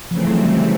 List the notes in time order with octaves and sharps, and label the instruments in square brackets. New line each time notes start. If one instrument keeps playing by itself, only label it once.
[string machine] C#3 E3 A3 C4 [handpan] F3
[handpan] F#3
G3